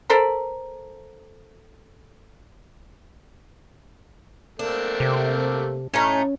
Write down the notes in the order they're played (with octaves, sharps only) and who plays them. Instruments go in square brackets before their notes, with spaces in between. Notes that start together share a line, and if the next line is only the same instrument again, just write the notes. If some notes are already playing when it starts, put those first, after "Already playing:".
[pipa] A4 A#4 C5 B5
[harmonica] A3 A#3 C4 [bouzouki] D4
[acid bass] C3
[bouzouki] A2 A3 D#4 [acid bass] C#4